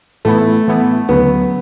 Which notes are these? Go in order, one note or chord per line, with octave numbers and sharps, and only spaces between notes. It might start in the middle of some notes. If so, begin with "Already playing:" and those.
A2 E3 A3 B3 E4
A2 E3 B3 E4
D2 C#3 F#3 B3